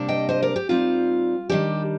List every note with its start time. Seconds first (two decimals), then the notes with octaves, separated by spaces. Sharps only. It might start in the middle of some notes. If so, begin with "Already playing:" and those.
Already playing: C3 G3 A#3 D4
0.08 D#5 G5
0.29 C5 D#5
0.43 A#4 D5
0.56 G4
0.69 A#2 G3 C4 D#4 F4
1.49 D#3 G3 D4 G4